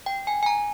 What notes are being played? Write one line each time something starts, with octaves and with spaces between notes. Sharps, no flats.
G5
G#5
G#5
A#5